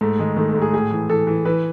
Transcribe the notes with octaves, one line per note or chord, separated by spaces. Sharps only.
G#2 A3
D#3 G#3
D#3 A3
A3
G#2
G#4
A2 G#4
E3
E3 A4
E3
E3 B4